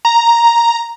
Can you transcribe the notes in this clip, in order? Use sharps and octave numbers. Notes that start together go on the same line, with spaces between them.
A#5